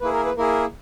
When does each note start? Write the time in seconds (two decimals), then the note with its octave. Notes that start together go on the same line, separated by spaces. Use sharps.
0.01 A#3 E4 G#4 B4
0.13 A#4
0.25 B4
0.37 A#3 E4 G#4 A#4